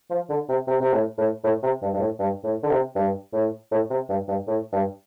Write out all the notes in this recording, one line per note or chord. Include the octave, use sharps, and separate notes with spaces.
F3
D3
C3
C3
C3
A2
A2
A2
C3
G2
G2
A2
G2
A2
D3
C3
G2
A2
A2
C3
G2
G2
A2
G2